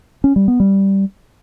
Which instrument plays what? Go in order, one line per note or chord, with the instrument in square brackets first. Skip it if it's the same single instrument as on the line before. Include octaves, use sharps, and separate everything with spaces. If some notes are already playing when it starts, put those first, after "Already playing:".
[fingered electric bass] C#4
G3
B3
G3